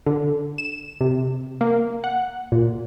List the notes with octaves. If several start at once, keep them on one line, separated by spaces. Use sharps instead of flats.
D3
E7
C3
A#3
F#5
A#2